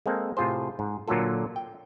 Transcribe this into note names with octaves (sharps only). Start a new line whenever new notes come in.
G#3 A#3 C4 A4
A2 C3 F4 G#4 C5
G#2
A#2 D3 F#3 A#3 F4 A4
G5